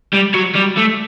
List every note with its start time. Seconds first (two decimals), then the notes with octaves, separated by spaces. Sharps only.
0.13 G3
0.34 F#3
0.55 G3
0.77 A3